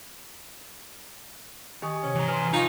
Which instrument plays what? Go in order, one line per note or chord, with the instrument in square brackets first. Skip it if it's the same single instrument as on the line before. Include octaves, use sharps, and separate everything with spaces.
[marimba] D#3 C#6 [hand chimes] G4 G#5 D#6
[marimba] C3 C#5 [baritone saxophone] C#4
[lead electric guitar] E3 A#5
[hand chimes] B4 G#5 [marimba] C6 F6
[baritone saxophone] D#4 [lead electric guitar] F4 [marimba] F5 C#6